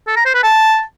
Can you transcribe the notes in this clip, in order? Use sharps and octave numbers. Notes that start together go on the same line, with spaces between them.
A4
A#5
C5
B4
A5